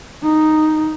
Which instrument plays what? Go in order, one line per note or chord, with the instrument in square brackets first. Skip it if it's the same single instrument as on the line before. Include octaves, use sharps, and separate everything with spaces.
[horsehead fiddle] D#4